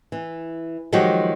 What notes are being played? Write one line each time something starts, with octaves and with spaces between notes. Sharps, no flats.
E3
D#3 F3 F#3 G#3 F#4 G4